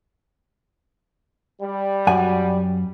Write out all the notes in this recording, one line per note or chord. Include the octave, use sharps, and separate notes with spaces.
G3
F#2 F#5 G#5